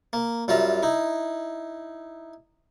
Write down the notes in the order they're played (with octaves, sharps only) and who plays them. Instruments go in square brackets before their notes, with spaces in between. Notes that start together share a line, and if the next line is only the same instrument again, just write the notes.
[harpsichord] A#3
F#2 G3 F4 E5 A#5
D#4 E4